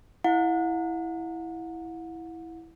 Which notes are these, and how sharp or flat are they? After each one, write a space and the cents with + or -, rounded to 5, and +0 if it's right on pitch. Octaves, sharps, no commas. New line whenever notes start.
E4 +0 F#5 -35